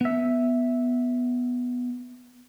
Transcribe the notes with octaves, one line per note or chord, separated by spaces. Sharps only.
B3 E5